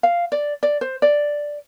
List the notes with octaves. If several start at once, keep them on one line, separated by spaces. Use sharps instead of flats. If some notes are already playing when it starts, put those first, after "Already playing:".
F5
D5
D5
C5
D5